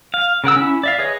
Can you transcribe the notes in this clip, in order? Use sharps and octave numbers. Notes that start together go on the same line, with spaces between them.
F5
C#3 A#4 F#5 E6
C#4 E4
D5 E5 F5
G#4 B4 C#5 D#5